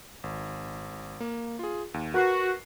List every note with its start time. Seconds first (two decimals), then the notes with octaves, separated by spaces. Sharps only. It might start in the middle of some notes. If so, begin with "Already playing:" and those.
0.24 G#1
1.20 A#3
1.59 F4 G#4
1.94 D#2
2.14 F#4 A#4 B4 C7